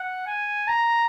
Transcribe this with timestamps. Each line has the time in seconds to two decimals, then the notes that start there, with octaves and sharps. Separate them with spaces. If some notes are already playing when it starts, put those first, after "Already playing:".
Already playing: F#5
0.27 G#5
0.68 A#5